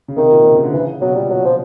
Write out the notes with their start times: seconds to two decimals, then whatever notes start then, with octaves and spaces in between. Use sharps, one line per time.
0.08 C#3
0.16 C3 D#3
0.31 A#2
0.45 C3
0.54 C#3
0.64 D3
0.74 C#3 E3
1.01 B2 F#3
1.15 A#2 G3
1.30 F#3
1.45 F3